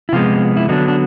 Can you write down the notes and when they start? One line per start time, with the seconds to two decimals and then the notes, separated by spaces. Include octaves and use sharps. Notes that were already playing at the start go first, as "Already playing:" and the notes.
0.09 E4
0.13 C3 F3 G#3 B3 F4
0.57 E4
0.68 D3 F#3 B3 D4 D#4
0.88 D4